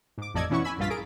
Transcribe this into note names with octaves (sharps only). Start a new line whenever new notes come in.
G#2 D6
A1 F2 A4 D5 D#5 G#6
B2 E3 C#4 E4 F#5 C#6
G#5 B5 E6
A#1 G2 F4 A6 B6
G#4 A#4 D7